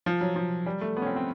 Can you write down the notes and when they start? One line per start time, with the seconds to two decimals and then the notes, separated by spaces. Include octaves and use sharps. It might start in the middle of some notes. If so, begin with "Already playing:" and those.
0.06 F3
0.21 F#3
0.36 F3
0.66 G3
0.81 A3
0.97 B3
1.02 C#4
1.06 C4
1.16 C4